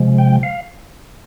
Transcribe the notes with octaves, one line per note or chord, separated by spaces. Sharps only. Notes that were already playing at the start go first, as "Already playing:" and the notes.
Already playing: C3 F3 G#3
G5
F5